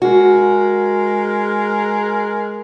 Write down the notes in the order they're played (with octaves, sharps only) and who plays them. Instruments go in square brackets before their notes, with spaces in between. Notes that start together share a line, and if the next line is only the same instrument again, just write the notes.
[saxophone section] G#3 A#4 [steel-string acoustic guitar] F#4